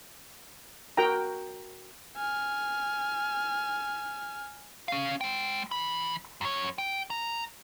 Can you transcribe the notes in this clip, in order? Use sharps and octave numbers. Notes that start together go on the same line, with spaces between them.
F#4 A#4 G5 A#5
G#5 F6
C#4 F5
G#3 G5
E3 B5
F#2 C#5
G5
A#5